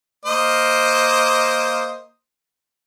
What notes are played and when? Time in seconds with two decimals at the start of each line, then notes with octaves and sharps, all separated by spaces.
0.25 A#3 C5 D#5